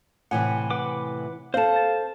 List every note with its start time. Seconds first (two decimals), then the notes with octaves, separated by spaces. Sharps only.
0.31 A2 C3 E3 F#5 G#5
0.71 B4 F#5 D6
1.54 C4 A4 C5 F5 A5
1.76 A6